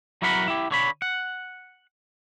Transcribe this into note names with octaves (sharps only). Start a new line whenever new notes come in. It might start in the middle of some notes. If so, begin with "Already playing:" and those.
F#3 E4 F#4 A#4 F#5 B5
E4 G4
D3 C#5 B5
F#5